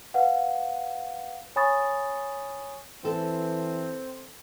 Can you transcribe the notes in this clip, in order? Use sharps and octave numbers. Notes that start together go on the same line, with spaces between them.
B4 F5 F#5
C#5 G#5 B5 C#6 D#6 A6
E3 C4 A4